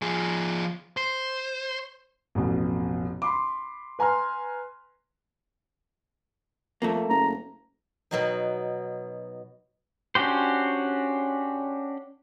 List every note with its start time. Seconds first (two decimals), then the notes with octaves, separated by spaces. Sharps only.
0.02 F3 G#4
0.97 C5
2.35 A1 F2 B2
3.22 B5 C6 D6
3.99 B4 G#5 A#5 C6 F6
6.82 F2 A3 A#3
7.09 F#1 A#5
8.11 B2 F#3 D#4
10.15 C#4 D4 F#4 G4 C5